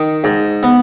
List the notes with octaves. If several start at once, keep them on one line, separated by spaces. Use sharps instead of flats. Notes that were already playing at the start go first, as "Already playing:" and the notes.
Already playing: D#3
G#2
B3